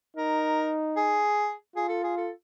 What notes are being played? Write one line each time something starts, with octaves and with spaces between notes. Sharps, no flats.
D#4 A#4
G#4
F4 G#4
A4
G#4
A4